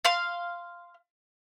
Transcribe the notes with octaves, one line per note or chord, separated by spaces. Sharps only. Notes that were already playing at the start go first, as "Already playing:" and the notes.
F5 C6